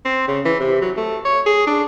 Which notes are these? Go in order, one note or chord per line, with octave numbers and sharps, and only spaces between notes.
C4
C#3
E3
C3
F#3
A3
C#5
G#4
D4